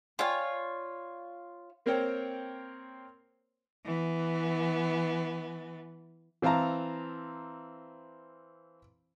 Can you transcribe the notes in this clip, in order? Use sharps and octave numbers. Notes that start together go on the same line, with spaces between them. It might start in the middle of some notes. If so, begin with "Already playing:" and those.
F4 C#5 D5 G5 G#5
A#3 C4 A#4 C5 C#5 G5
E3 B3
E3 C4 F5 A5 A#5